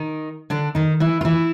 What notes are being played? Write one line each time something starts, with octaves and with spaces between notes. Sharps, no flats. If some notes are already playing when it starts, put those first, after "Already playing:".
Already playing: D#3 D#4
D3 D4
D#3 D#4
E3 E4
F4
E3 E4